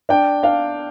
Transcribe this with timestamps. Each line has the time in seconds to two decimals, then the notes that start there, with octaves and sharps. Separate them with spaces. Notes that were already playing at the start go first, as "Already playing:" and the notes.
0.09 D4 G5
0.43 D4 F5